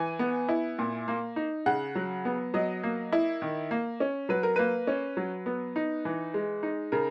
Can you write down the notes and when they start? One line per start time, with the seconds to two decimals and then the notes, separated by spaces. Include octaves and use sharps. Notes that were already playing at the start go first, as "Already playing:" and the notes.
Already playing: E3 G#5
0.19 B3
0.49 E4
0.79 A#2
1.08 A#3
1.36 D#4
1.66 C#3 F#5
1.95 F#3
2.25 B3
2.54 F#3 D#5
2.83 A#3
3.13 E4
3.42 D#3
3.71 A#3
4.00 C#4
4.29 F#3 B4
4.43 A#4
4.56 A#3 B4
4.87 C#4
5.17 F#3
5.46 B3
5.76 D#4
6.05 E3
6.34 G#3
6.63 D#4
6.92 C#3 A#4